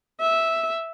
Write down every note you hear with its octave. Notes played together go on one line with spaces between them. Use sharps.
E5